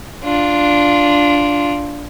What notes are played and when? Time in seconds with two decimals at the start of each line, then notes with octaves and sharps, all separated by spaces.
0.23 D4 F4